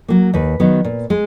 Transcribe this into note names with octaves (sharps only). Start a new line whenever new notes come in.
F#3 A#3
D#2 B4
D#3 F#3 B3
A#2
G#3